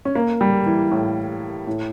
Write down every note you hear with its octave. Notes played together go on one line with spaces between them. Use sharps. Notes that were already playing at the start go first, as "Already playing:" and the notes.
C#4
A#3
G3
E3
A2
A2